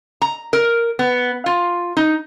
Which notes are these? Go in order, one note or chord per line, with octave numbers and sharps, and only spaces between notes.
A#5
A#4
B3
F4
D#4